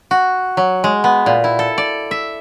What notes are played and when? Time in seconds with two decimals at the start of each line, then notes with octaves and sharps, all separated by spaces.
0.11 F#4
0.57 F#3
0.84 G#3
1.04 B3
1.26 A#2
1.44 E4
1.59 A4
1.78 D5
2.11 E5